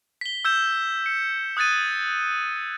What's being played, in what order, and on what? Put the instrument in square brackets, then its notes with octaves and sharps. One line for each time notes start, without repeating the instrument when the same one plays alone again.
[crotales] B6 G7
E6 G6 E7
C#7
D#6 F#6 G#6 A6 D#7